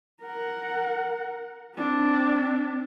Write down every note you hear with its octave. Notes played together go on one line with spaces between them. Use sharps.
A#4 F#5
C4 D4